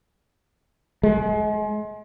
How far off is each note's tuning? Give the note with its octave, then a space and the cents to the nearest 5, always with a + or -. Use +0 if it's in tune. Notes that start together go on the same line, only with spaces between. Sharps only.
G#3 +35